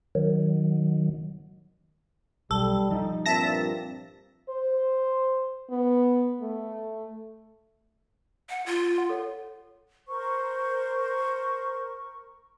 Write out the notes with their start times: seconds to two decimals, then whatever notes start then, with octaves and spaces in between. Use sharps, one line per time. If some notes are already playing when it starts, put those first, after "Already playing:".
0.15 D#3 F#3
2.51 B1 G3 A4
2.90 F3 G3 D#4
3.26 G2 A#2 C4 E5 A5 A#6
4.49 C5
5.70 B3
6.41 A3
8.49 F#5
8.66 F4
8.98 F#5
9.09 A4 C#5 F#5
10.08 A#4 C5 C#6